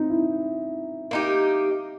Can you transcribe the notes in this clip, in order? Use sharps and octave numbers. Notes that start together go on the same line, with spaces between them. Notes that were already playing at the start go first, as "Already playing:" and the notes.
Already playing: C4 D#4
E4
A#3 D#4 G4